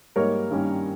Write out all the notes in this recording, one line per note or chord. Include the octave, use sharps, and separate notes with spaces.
G#2 G3 A#3 D#4 A#4 C#5
G2 D#3 G3 A#3 C#4